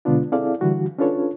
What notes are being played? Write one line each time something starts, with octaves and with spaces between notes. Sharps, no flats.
B2 D3 G#3 B3 D4 F4
C4 E4 G#4 A4 D5 F5
D3 E3 G3 F#4
C#4 D4 F4 A4 B4 C#5